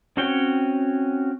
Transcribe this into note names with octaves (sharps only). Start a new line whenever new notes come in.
C4 C#4 F#4 C#5 G5